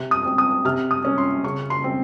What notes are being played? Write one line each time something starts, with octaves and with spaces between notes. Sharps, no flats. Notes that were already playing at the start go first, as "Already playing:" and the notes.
Already playing: C3
D#6
C4
D#6
C3 F6
D#6
C#4
C6
C#3 C#6
C6
C4